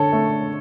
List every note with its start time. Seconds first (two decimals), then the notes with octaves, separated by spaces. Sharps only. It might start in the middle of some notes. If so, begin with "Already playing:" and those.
Already playing: D3 A4 C#5
0.13 A3